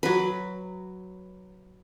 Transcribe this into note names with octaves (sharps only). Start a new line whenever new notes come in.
F#3 B4